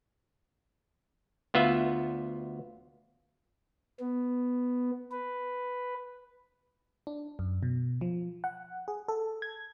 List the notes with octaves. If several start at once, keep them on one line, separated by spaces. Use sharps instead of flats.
D2 B3 F4 E5
B3
B4
D4
F#2
B2
F3
F#5
G#4
A4
G#6